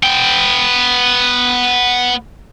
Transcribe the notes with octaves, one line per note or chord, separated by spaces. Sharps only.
B3 G5